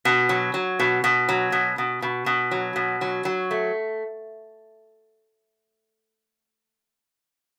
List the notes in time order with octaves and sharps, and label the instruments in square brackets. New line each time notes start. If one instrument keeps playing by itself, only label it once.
[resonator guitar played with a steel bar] B2
F#3
F#3
B2
B2
F#3
B2
B2
B2
B2
F#3
B2
F#3
F#3
A3